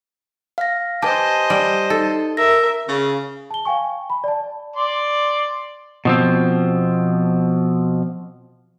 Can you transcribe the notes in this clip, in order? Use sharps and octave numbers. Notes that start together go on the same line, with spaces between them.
F5 A#6
G4 B4 C5 D#5 G#5 A5
G3
D#4 A4
A#4 E5 A#6
C#3
A5 G7
F5 G5 G#5 C#6
B5
D5 A5
D5 C6
B2 F3 C4